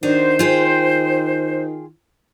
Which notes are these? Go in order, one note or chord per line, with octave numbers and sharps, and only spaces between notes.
D#3 D4 D#4 F#4 C5
F4 G#4 G5